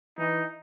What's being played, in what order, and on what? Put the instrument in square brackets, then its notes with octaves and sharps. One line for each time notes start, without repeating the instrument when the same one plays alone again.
[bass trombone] E3 [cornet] D#4